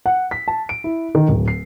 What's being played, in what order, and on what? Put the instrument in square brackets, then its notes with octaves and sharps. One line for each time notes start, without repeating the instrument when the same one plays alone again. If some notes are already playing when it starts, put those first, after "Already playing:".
[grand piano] F#5
B6
A5
D7
E4
D#3
D1
C7